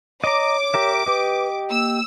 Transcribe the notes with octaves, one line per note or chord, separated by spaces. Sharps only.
C#5 D#5 A#5 D6
G4 A#4 E5
G4 B4 D#5
A#3 E6